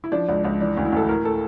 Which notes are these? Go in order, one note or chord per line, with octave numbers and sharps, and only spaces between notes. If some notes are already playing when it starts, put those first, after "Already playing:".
E4
F3 D4
C#2 D4
C#2 D4
E3 D4
D2
E4
D2 A4
A2 A#4
A2 A4